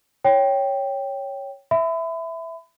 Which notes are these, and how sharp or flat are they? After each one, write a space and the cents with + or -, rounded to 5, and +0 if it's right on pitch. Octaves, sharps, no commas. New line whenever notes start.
C#5 +0 G5 +0
E5 +0 B5 +35